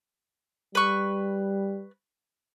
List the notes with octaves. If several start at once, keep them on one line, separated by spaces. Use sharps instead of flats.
G3 B4 C#6